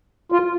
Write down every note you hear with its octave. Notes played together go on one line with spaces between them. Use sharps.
F4